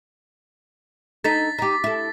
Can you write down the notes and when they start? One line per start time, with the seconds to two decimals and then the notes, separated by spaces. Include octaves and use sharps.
1.24 D#4 A4 A6 B6
1.58 D#4 G4
1.84 E4 A4